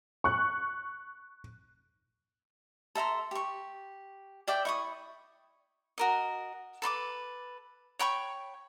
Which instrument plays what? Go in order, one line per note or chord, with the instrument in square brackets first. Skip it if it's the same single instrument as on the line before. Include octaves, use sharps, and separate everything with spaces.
[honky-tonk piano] C#6 F#6
[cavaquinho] A4 E5 A#5 C6
G4 C#6
D5 E5 G5 D6
E4 C#6 D#6
F#4 A#4 D#5
A4 B4 C6 D6
C#5 G5 B5 C#6